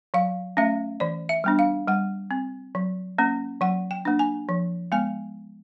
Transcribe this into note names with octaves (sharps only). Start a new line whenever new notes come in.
F#3 F5
A3 C#4 E5
E3 D5
E5
G3 B3 D4
F5
G3 F#5
C4
F#3
A#3 C#4
F#3 F#5
G5
A#3 D4
G#5
F3
G#3 B3 G#5